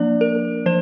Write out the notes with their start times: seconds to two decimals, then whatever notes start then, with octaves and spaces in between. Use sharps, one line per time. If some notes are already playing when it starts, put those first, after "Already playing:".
Already playing: F3 A#3 D4 D5
0.21 A#4
0.66 F3 C5